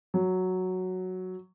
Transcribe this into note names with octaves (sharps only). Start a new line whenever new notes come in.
F#3